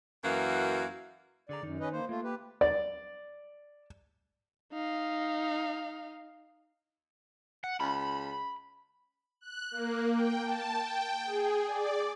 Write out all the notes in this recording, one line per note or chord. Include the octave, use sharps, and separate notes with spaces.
F#2 E3 A#3 F#4
D3 G#4 D5 A#5
F#2 D#3 D#4
C#4 B4 D#5
A#3 C5
A3 A#3 F4
G4 B4
D5
D#4 F5
F#5
C#2 B5
F#6
A#3
G5
A5
G5
G#4
D5